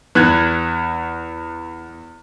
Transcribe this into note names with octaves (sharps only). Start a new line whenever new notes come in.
E2 B3 F#6 G#6